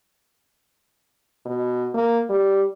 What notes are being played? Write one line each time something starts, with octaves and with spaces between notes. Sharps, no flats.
B2
A#3
G3